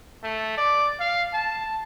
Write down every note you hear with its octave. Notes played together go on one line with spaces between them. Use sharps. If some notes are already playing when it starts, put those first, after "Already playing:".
A3
D5
F5
A5